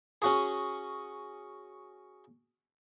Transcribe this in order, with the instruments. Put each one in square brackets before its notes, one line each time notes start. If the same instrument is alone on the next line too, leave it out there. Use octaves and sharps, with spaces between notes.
[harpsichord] C#4 F#4 G#4